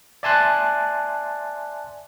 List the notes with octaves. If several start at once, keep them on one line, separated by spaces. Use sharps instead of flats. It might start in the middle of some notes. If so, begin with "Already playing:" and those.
D5 E5 G#5 A5 C6 F#6